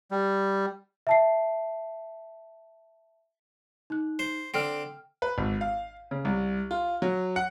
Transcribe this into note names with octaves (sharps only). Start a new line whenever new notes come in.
G3
E5 A5 C7
D#4 F#6
C5
D3 C4 G5 F6
B4
G#1
F5
C#3
C2
F4
F#3
F#5